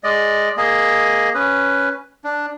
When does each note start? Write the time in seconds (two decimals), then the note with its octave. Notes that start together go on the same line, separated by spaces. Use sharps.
0.04 G#3 D5 D#5
0.57 A#3 G#4 D#5
1.35 C#4 B4
2.24 D4